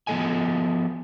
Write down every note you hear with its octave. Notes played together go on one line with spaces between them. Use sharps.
F3 B3 C4 A4 D#5 G#5